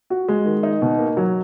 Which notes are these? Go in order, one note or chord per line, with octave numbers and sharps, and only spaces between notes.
F#4
G#3
D#3
D#4
B2
A#3
F#3